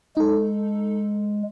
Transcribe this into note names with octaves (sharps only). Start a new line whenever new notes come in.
G#3 D#4 A4